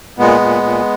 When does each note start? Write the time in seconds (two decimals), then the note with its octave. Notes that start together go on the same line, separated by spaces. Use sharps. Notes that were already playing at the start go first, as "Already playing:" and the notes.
0.18 A#2 G#3 B3
0.41 A#2
0.63 A#2